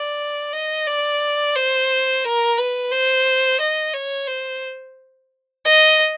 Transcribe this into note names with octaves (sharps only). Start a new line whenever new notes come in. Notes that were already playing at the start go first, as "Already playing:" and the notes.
Already playing: D5
D#5
D5
C5
A#4
B4
C5
D#5
C#5
C5
D#5